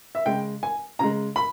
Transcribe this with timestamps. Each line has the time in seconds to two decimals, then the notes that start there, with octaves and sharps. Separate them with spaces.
0.15 E5
0.26 C#3 G#3 G5
0.63 G#5
0.99 C#3 G#3 A#5
1.36 B5